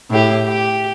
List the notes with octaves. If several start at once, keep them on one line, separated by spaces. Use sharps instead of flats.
A2 G4
G4